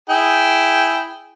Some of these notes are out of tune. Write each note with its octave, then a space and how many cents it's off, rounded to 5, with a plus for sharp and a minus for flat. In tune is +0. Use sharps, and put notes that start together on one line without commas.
E4 +0 G#4 +0 G5 -10